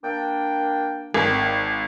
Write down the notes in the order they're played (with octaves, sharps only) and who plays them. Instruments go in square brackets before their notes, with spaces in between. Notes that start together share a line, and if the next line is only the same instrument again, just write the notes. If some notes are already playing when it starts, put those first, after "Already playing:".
[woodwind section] A#3 D4 G5
[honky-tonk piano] G#1 [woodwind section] D#3